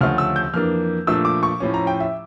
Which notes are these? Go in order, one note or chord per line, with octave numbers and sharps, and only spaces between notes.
D2 C#3 F3 A3 F6
E6
G6
F2 E3 A#3 D4 F6
A#2 F3 A3 D4 E6
D6
C#6
A2 F3 C#4
A#5
G5
E5